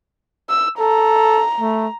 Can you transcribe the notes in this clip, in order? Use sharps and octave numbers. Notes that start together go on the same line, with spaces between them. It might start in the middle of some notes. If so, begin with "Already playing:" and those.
E6
A4 A#5
A3